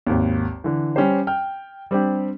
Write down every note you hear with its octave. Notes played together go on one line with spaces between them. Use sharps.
G#1 D#2
D3 E3
G3 C#4 G4 C5
G5 F6
G3 C4 D4 G4